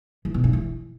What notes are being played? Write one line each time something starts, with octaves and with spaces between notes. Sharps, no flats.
E3
B2
G2
E3